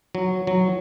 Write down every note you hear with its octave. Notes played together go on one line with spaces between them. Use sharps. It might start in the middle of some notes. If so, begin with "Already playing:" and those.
F#3
F#3